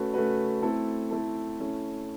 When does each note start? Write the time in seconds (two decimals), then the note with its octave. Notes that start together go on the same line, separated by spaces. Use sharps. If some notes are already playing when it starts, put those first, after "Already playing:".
Already playing: A3 C#4 F#4 B4
0.14 A3 C#4 F#4 B4
0.62 A3 C4 E4 A4
1.11 A3 C4 E4 A4
1.60 A3 C#4 E4